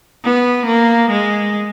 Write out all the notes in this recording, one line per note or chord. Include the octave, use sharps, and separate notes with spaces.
B3
A#3
G#3